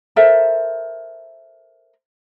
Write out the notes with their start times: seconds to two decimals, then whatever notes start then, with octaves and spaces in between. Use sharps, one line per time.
0.16 A4 A#4 C5 E5